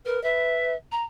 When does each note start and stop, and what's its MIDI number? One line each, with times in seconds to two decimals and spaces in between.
0.05 0.21 70
0.05 0.21 71
0.23 0.75 71
0.23 0.72 76
0.91 1.02 82